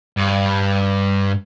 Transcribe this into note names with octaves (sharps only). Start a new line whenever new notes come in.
G2